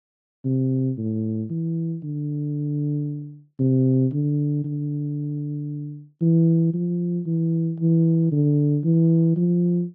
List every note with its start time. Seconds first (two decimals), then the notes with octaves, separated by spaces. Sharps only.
0.45 C3
0.98 A2
1.50 E3
2.03 D3
3.59 C3
4.13 D3
4.64 D3
6.22 E3
6.74 F3
7.26 E3
7.80 E3
8.32 D3
8.84 E3
9.37 F3